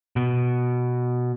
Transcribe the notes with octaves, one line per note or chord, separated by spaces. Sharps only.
B2